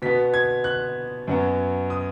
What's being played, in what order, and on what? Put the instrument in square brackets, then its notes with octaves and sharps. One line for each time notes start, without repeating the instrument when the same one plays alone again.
[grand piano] B2 B3 B6
G#6
F#6
F#2 F#3 B3
D#6